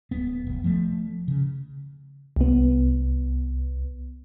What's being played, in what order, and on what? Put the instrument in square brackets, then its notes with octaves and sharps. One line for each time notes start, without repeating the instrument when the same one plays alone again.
[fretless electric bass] D1 B3
F1
F3 A3
C#3
[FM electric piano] C2 B3